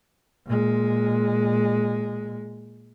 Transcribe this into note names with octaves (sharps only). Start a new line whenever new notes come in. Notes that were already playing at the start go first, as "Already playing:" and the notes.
A#2 G#3